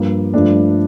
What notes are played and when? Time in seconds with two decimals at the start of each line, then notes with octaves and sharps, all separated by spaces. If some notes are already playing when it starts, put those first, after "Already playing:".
Already playing: G2 F3 A#3
0.34 G2 F3 A3 D4